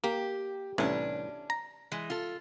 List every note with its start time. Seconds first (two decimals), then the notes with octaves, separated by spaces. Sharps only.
0.04 A#3 G4
0.78 C2 A2 E3 C#4 D4
1.50 A#5
1.92 E3 G#3
2.10 F4 A4